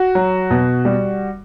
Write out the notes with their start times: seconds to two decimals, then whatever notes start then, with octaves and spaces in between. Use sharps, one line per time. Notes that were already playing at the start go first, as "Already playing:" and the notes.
Already playing: F#4
0.15 F#3
0.50 B2
0.85 G3